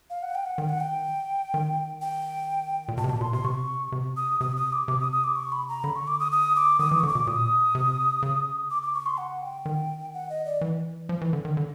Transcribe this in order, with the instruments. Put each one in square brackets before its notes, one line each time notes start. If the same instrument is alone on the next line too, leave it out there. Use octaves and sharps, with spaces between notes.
[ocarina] F5
F#5
G5
F#5
[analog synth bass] D#3 [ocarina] G5
[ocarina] F#5
G5
[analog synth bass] D#3
[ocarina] G5
[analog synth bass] A#2
[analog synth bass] B2 [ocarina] A5
[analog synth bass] C3
[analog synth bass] B2 [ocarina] A5
[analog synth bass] A#2 [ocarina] C6
[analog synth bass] C3 [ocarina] C6
[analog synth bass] C3 [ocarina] C#6
[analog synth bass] C3
[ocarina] D#6
[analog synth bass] C3 [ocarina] D#6
[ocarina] D#6
D6
[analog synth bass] C3 [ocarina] D6
[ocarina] D#6
D#6
D6
C#6
B5
A#5
[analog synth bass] D3 [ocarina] B5
[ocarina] C#6
D6
D#6
D#6
D6
[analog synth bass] D#3 [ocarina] D#6
[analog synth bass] E3 [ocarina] D6
[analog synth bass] D3 [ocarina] C#6
[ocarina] D6
[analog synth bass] B2
[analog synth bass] A#2 [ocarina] D#6
[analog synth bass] C3
C#3
[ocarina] D6
D6
C#6
C6
F#5
G5
[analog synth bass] D#3
[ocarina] F#5
D#5
D5
[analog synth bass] E3
F3
E3
D3
D#3
D3